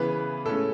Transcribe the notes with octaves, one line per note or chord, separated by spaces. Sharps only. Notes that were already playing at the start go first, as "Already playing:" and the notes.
Already playing: C#3 E3 B3 B4
A2 G#3 C#4 A4